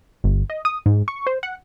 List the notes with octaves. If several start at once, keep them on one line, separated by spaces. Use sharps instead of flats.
G1
D#5
D#6
G#2
C#6
C5
F#5